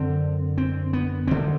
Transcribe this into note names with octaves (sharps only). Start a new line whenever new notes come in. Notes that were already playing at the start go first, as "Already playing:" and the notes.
Already playing: F#2 D3 C4
C4
B3
D2 D3 C4